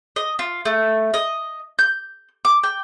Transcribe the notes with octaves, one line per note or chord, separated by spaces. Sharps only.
D#5
F4
A3
D#5
G6
D6
G5